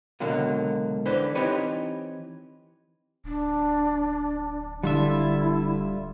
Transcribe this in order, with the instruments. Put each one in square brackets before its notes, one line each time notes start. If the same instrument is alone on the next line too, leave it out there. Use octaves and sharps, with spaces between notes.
[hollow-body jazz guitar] C#2 B2 D3 F#3 A#3
D3 E3 B4 C5
E3 C4 D#4 G4 B4 C#5
[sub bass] D1 [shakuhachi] D4
[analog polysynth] D3 [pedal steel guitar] G3 F4 E5 [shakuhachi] E4